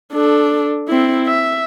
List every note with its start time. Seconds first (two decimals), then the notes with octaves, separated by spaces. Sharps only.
0.12 D4 A4
0.88 C4 E4
1.27 E5